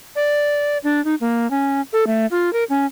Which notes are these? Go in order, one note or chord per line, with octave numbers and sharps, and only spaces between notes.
D5
D4
D#4
A#3
C#4
A4
A3
F4
A#4
C#4